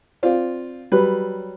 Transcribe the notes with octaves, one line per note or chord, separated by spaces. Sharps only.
C4 F4 D5
F#3 G3 B4